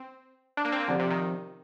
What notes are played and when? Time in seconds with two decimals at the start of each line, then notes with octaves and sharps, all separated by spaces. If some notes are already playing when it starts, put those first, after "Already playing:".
Already playing: C4
0.57 D4
0.65 A#3
0.72 C4
0.80 A#3
0.88 D3 F3 C4 G4 D5
0.99 C3
1.10 D#3